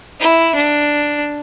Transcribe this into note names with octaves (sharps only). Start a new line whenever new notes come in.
E4
D4